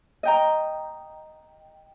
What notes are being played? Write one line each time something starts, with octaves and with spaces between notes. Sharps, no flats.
D#5 G5 A#5